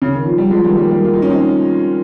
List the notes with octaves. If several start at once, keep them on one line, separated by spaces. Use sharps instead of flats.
C#3
D#3
F3
G3
F3 G#3
D#3 G3
G3 A#3
G3 A#3
F4
D#4
C#4
C4 D#4